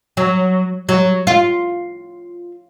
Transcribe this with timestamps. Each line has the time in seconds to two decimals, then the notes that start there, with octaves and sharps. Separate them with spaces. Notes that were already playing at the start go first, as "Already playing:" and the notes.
0.17 F#3
0.89 F#3
1.27 F4